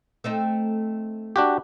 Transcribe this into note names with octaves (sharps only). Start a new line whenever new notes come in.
A3 C4 D#4
D4 F#4 G4